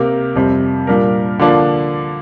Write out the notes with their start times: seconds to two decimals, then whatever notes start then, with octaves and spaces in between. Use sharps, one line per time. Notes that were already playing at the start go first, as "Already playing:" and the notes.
Already playing: C3 A#3 G4 A#4
0.35 F2 C3 G3
0.87 A#2 G3 D4 A#4
1.39 D3 F3 A#3 D4